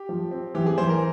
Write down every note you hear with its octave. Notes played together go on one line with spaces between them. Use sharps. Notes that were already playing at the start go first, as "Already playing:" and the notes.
Already playing: G4
F3
C4
E3 G4
G#4
E3 C5
A#4